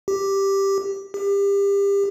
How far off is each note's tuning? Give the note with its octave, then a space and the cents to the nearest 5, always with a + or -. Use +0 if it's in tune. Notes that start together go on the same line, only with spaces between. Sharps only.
G4 +0
G4 +30